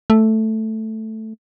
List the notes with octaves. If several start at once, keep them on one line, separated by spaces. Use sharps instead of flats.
A3